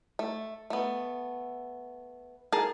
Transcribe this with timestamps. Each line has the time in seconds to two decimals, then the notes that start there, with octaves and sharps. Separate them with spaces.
0.19 A3
0.70 A3 B3
2.52 G#4 A#4 A5